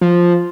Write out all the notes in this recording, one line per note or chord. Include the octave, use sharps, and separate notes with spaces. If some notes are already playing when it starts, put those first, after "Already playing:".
F3